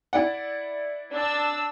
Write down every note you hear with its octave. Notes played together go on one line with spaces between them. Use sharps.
E4 D5 F#5
D4 E6